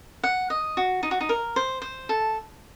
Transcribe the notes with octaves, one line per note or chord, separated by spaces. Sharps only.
F#5
D#5
F#4
D#4
F#4
D#4
A#4
C5
C5
A4